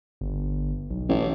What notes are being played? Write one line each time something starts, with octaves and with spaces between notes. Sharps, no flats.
G1
B1
A1